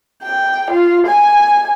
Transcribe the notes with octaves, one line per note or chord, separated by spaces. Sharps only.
G5
F4
G#5